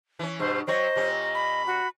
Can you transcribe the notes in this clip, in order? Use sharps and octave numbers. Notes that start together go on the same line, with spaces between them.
E3 C#4
G2 B2 C5
F#3 C4 C5 C#5 D#5
A#2 G3 C#4
B5
F#4